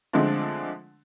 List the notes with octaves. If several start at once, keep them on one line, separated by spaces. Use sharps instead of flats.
D3 F3 G#3 A3 C4 D4